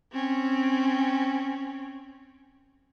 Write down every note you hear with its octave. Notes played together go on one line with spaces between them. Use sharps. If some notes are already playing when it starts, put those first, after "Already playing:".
C4 C#4